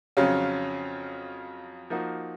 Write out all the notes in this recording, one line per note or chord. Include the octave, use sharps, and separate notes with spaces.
F2 C#3 F#3 C#4 F4
F3 A#3 D#4 F#4